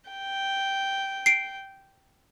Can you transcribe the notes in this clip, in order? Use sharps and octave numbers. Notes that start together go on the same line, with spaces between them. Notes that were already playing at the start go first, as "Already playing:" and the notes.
G5
C7 D7